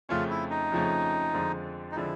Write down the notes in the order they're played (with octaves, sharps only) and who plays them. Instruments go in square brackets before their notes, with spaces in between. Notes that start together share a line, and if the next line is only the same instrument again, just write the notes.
[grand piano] F2 C#3 F3 A3 C#4 [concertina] F4
[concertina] E4
D#4
[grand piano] F2 C#3 F3 A3 C#4
F2 D3 F3 G#3
[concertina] D#4
[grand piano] D3 F3 G#3 [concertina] E4